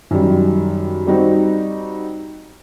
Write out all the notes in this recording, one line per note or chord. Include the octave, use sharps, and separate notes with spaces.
F#2 D#3 G3
G3 C4 D#4 F#4